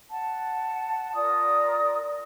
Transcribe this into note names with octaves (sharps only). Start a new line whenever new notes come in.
F#5 A5
F4 A#4 D5 D#6